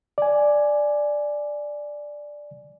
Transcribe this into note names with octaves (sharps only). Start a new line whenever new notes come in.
D5 G#5